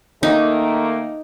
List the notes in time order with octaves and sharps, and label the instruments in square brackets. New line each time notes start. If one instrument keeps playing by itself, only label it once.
[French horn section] D#3 A3 A#3 [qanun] D#4